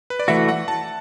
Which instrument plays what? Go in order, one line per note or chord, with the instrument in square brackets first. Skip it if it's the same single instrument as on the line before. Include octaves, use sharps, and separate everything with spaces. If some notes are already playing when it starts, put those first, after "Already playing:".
[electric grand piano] B4
D5
[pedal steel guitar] E3 A3 F#4 [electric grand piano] E5
[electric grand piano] F#5
A5